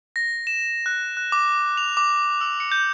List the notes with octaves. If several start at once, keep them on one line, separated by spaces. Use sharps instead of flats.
A#6
E7
F#6
F#6
D6
F7
D6
E6
C#7
G6